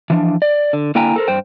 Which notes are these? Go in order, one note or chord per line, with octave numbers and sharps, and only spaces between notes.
E3 F3 D4
D5
D3
D3 A#3 E4 G5 G#5 A#5
A4 A#4 C5
G2 C5 G5